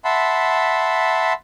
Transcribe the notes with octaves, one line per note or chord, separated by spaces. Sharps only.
E5 F#5 A5 B5 C6